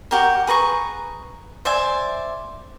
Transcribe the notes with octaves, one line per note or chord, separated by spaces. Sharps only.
F#4 G4 A#4
G#4 B4 A#5 C#6
C5 D5 E5 G#5